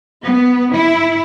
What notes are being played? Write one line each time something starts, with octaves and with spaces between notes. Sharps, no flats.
B3
E4